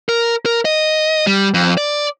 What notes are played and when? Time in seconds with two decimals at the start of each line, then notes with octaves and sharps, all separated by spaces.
0.09 A#4
0.46 A#4
0.65 D#5
1.27 G3
1.54 F2
1.77 D5